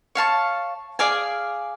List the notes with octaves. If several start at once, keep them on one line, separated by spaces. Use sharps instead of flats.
C#5 F5 A5 C#6
G#4 D5 F5 G#5